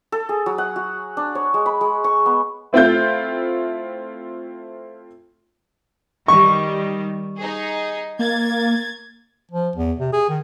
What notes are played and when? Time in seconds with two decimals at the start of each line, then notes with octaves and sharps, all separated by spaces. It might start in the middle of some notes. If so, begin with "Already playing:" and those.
0.12 A4
0.29 G#4
0.46 F#3
0.58 F#5
0.76 F#4
1.17 D4
1.35 C#5
1.54 G#3
1.66 B5
1.81 G#3
2.04 C#6
2.26 B3
2.73 A3 C4 E4 F4 G6
6.28 D#3 G3 C#6
7.37 D#4 G#4
8.19 A#3 G#6 A6
9.51 F3
9.76 E2
9.99 C3
10.13 G#4
10.29 D#3